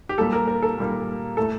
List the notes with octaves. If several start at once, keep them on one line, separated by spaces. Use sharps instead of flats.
G4
A#2 G3 A#3 A4
A#4
A#4
A4
A#2 G3 A#3
A2 A3 A4